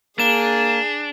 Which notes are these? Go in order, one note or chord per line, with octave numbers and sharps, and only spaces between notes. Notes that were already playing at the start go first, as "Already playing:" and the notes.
A#3 D4 G#4 E7